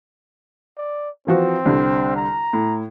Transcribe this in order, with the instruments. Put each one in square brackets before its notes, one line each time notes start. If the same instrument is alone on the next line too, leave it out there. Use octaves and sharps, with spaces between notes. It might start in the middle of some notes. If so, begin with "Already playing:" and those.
[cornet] D5
[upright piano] E3 F3 F#4 [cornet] C4
[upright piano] C2 D3 G3
[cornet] A#5
[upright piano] A2